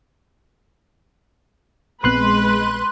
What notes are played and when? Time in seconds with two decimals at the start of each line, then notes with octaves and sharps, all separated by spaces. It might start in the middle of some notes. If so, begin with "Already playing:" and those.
2.04 A#1 G#3 B3 C4 B4 C6 F#6